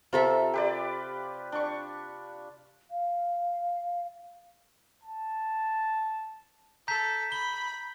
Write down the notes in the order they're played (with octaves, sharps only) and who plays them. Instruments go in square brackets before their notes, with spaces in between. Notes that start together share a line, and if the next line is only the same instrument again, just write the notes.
[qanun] C3 A4 E5 [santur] F4 A#4
[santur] G4 B4 D5
D4 C#6
[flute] F5
[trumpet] A5
[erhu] A4 [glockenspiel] A#5 G6 B6
[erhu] B5 [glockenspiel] G7